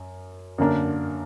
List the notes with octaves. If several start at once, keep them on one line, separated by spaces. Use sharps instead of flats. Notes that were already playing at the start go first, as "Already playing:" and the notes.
Already playing: F#2
F#2 D3 A#3 D4 A#4